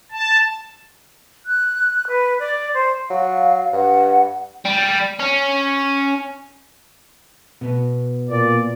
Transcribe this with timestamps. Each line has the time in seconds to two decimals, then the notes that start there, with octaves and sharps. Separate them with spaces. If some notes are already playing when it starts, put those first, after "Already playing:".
0.12 A5
1.46 F#6
2.07 B4
2.39 D5
2.74 C5
3.10 F#3 F5
3.73 G2 F#5
4.65 G3
5.19 C#4
7.61 B2 B3
8.30 A#2 D5